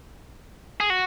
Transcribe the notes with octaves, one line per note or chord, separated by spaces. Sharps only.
G#4
F#4